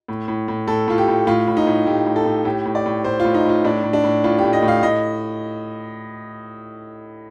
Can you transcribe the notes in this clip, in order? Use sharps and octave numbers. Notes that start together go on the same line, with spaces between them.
A2
A2
A2
A2 A4
A2 F4
G4
A2
A2 F4
A2
D#4
A2
A2 G4
A2
A4
A2
A2 G4
A2
D5
A2
A2 C5
F4
A2
D#4
A2 F4
A2 D4
A2
D4
A2
A2 F4
G4
A2
D#5
A2
F5
A2 D#5